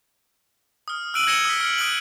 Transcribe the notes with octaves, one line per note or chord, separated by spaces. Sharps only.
D#6 F6
E6 F#6 D7 D#7 F#7
G#6 A#6 C#7 D#7 E7 G7
D#6 B6
F6 C#7
D#6 F#6 D7 F#7